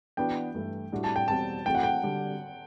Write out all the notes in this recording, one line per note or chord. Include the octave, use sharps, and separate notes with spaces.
E3 B3 D4 F#4 G5
G2 E3 A3 E4
A2 G3 D4 F#4
A5
G5
E2 B2 G3 C4 F#4 A5
E3 A3 C4 F#4 G5
F#5
G5
D3 G3 D4 F#4